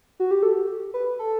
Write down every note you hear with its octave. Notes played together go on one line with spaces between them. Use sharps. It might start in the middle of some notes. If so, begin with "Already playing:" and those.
F#4
G4
A4
B4
A4